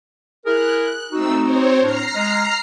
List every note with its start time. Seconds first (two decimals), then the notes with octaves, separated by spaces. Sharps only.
0.46 E4 G#4 A#4 F#6
0.80 F#6
1.12 A3 C4 D#4 F#4 E6
1.41 C4 C5 C#5
1.82 A2 D4 A#5 F6 C7
2.15 G#3